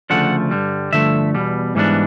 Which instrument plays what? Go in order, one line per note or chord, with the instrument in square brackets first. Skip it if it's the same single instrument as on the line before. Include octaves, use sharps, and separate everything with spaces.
[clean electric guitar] D2 C#3 F3 A3 D4 F#5
G2 D3 G3
G2 D3 F3 A3 E5
E2 B2 G3
G#2 E3 G3 B3 D4